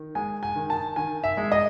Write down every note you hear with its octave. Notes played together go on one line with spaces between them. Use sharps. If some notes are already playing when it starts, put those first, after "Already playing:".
Already playing: D#3
G#3 G#5
G#5
D#3
A5
D#3 G#5
E5
G#3
D#5